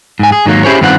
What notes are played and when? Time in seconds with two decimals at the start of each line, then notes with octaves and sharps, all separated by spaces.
0.19 G#2 G#5
0.32 G#4
0.46 G#2 D#3 F#3 A#3
0.64 C#4 E4 G4 G#4 C5 C#5
0.81 G2 D#3 B3 C4 F4 F#5